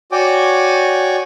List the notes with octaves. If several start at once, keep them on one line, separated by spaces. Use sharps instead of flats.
F#4 C#5 D5 G5 G#5 D6